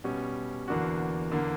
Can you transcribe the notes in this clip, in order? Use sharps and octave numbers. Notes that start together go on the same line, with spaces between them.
B2 G3 C#4
E2 D3 A#3 D4 F#4
E2 D3 A#3